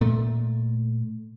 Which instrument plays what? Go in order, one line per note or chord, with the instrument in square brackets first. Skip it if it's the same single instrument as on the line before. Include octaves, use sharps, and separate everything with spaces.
[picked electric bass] A#2 A3